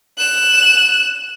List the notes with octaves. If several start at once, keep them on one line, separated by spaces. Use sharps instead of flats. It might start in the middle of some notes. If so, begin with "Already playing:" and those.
F#6 E7